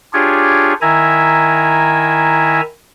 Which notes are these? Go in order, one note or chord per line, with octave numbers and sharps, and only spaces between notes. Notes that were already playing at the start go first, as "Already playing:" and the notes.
D4 F4 G4 G#4 C#5
D#3 E4 E5 G#5 A#5